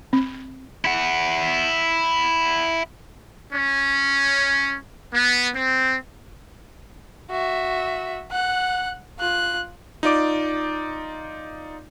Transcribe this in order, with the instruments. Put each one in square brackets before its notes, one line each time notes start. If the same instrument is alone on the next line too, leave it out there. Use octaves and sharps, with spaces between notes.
[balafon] C4
[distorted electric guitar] E4 F#5
[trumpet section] C#4
B3
C4
[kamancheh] F#4 E5
F#5 F#6
F4 F#6
[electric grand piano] D#4 F4 D5 D6